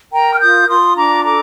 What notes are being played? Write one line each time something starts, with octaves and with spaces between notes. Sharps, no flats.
A#4 G5 A#5
F6
F4 D#6 G6
F4 C6 D#6
D4 A#5 D6
A4 A#5 D6